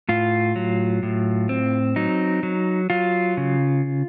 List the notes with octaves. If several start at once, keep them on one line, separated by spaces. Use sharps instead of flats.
A2 F4
F#3
A2
C4
F#3 D#4
F#3
F#3 F4
C#3